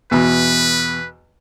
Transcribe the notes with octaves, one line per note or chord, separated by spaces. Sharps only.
E2 B2 B4